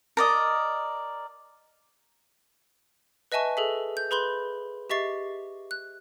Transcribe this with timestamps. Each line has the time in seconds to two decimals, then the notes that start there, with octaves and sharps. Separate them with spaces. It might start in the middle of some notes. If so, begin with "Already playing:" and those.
0.17 A#4 D5 D#5
3.32 B4 D#5 E5 G#5 A5 C#6
3.57 G#4 A4 E5
3.97 G6
4.11 G#4 B4 B5 C6 G6 G7
4.90 G4 D#5 E5 C#6 A6 C7
5.71 F#6